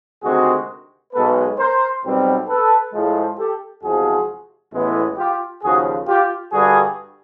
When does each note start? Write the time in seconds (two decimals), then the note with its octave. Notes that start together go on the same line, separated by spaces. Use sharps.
0.23 D2 C3 D#3 G#3 C4 F#4 G#4
1.13 B1 B2 G#3 B3 A4 B4
1.58 A#4 C5
2.03 B1 B2 G3 C4
2.48 A4 B4
2.93 A2 F3 G#3
3.37 G4 A4
3.83 E2 C3 F3 G#3 F#4 G#4
4.72 A1 A2 E3 G#3 B3
5.17 F4 G4
5.62 D#2 C#3 F3 F#4 G#4
6.07 F4 G4
6.52 G2 D3 G3 F#4 G#4